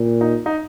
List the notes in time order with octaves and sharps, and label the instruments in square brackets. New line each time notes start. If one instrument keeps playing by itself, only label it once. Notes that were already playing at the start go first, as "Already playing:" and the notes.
Already playing: [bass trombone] A#2
[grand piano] D#4
D#4